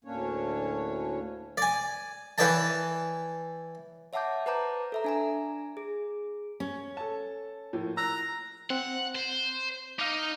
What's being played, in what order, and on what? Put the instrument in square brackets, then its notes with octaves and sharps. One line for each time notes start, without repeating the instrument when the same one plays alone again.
[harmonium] D2 A2 A#3 C#4 D4 C#5
[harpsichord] D5 G#5
E3 B4 C#5 D5 G5 A5
[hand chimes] C#5 E5 F#5 A5 D6 G6
B4 C5 A5 A#5 D6 G6
A4 E5 A#5
D4 G#5 A#5
G#4
[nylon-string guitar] C#4
[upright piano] A4 A5
A2 F3 A#3
[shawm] A#5 [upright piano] E6 F#6
[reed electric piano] C4 [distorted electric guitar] F#5
[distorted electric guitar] C5
[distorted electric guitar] D#4 [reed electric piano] F5 D6